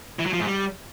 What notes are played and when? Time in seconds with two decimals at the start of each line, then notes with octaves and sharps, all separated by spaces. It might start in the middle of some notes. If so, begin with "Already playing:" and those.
0.19 E3
0.26 F#3
0.33 F3
0.40 G#2
0.47 G3